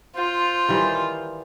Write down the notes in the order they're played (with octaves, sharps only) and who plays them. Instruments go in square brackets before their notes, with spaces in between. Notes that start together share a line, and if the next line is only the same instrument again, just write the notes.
[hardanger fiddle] F4 [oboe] C5
[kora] D#3 E3 G3